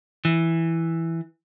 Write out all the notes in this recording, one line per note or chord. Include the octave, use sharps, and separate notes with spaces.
E3